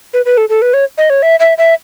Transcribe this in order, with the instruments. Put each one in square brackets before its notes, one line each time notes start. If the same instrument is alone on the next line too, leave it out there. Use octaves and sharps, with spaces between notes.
[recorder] B4
B4
A4
A4
B4
C#5
D#5
C#5
E5
E5
E5